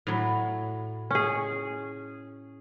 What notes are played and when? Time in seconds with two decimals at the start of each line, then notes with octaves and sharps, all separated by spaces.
0.07 A2 F#3
1.11 C#4 G#4